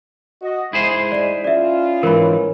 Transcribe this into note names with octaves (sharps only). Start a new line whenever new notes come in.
F#4 D#5
G#2 G#3 E4 G#4 C5
D5 D#7
C#4 F4 D5 E5
G#2 E3 A#4 C#5 B5